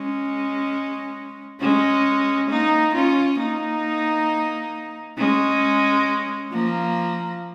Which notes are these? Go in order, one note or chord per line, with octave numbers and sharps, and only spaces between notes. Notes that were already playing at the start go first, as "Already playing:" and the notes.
Already playing: G#3 C#4
G#3 C#4
A#3 D#4
C#4 F4
A#3 D#4
G#3 C#4
F3 A#3